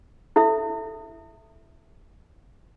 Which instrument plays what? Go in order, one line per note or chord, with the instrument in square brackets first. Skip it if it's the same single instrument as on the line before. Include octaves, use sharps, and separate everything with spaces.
[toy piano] E4 A4 E5